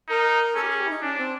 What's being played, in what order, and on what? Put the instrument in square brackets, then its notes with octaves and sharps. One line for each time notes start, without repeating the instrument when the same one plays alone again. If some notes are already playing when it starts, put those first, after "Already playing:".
[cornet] D#4 [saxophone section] A#4
[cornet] C#4 [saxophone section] A4
[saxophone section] G4
G#4
G4
E4
D#4
[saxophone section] C#4 [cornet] D4
[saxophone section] C4